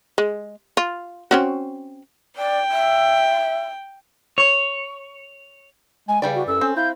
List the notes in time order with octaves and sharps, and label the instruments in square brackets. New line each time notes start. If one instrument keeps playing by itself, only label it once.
[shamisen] G#3
F4
C4 C#4 F#4
[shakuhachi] D5 [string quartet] G5
[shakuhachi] E5
[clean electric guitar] C#5
[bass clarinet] G#3 [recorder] G#5
[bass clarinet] C#3 [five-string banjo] E3 G3 D5 [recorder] G5
[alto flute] F#4
[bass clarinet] F#2 [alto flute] A4 [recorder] E6
[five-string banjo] C4 [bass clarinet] C#4
[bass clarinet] E4 [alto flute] F5 [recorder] G6